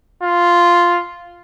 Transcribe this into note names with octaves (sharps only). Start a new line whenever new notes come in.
F4